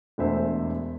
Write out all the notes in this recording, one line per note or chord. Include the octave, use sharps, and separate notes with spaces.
E1 E2 A3 C5 E5